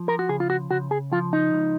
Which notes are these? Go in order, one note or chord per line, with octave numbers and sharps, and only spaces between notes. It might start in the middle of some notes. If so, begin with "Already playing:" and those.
Already playing: F3
A#4
F#4
C#3 G#4
F4
F#4
C#3 F#4
G#4
F3 F4
D#4
C#2